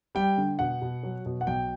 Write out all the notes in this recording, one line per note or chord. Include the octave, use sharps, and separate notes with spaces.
G3 G5
D3
B2 F#5
B2
F#3
B2
F#5
B1 G5